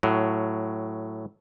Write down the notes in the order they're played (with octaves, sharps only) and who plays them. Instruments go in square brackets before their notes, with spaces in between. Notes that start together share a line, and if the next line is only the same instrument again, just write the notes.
[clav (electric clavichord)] A2 F#3